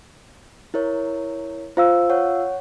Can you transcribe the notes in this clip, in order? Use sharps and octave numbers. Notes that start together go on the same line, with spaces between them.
E4 A#4 C#5
F4 C5 F5 E6
C#5 F#5